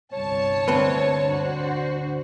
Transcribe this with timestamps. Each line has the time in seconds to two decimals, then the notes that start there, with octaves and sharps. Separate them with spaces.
0.13 G1 C2 C#5 A5
0.68 D2 C4 B4
1.28 D4 F#4 C5